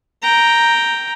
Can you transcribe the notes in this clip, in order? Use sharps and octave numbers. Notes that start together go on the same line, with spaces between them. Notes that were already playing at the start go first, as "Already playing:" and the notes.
G5 A#5